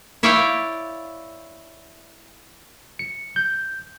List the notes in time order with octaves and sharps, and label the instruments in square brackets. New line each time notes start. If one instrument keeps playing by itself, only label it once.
[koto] E4 C#5 D5 F5 G5
[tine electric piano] C#7
G6